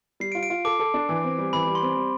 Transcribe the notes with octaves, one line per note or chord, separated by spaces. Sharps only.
G3 C7
D7
F4
D7
F4
A4 D6
A4
D4
E3
C4
G3
E3 B5
G3
C6
C4
G3